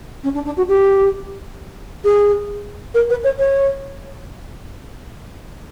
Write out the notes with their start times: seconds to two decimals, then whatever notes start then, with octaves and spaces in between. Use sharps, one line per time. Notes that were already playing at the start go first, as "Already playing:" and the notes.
0.23 C#4
0.34 D4
0.45 D4
0.57 F#4
0.68 G4
2.04 G#4
2.94 A#4
3.10 B4
3.24 C#5
3.39 C#5